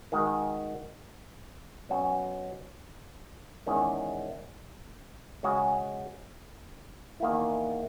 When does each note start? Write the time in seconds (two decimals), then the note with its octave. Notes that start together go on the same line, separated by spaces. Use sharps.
0.12 D#3 G#3 D#4 F#4
1.89 B2 F#3 C#4 F#4
3.66 E2 D#3 G#3 C#4
5.43 C#3 G#3 C#4 F#4
7.20 E2 D#3 A#3 E4